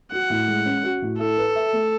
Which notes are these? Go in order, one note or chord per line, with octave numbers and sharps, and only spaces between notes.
F#4 F#5
A2
G#3
C#4
F#4
A2
E4 A4
B4
E5
A3